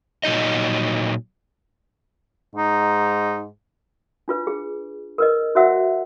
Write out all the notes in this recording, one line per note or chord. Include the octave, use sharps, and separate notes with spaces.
A#2 F#3 D#4 D#5
G#2 D#4
D4 F4 B4
G#4
A#4 B4 D#5
F#4 C5 C#5 E5 F#5 E6